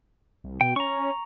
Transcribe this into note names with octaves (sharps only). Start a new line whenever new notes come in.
C2
B2 G5
C#4 A#5 C#6